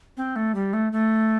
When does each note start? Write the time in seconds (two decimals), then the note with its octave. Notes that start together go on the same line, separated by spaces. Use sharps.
0.17 C4
0.36 A3
0.55 G3
0.73 A3
0.92 A3